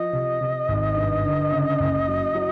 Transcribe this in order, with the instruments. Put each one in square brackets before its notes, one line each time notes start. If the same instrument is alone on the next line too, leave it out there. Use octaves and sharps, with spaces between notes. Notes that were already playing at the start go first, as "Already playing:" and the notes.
Already playing: [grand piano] F3 [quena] D#5
[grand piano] C3
C3
G#1
G2
D3
C#3
F#1
F#3
F#3